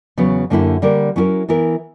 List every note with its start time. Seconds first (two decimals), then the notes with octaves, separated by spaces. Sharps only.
0.17 E2 C#3 F#3 B3
0.50 F#2 D3 A#3 E4 G4
0.82 D3 G3 A#3 D4 A#4
1.16 F#3 C#4 E4 G4 A#4
1.49 E3 B3 E4 A#4